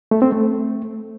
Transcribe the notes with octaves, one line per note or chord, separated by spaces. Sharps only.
A3
C4
A3